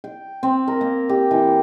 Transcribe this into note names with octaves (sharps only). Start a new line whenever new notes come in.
G5
C4
A#4
A#3
G4
E3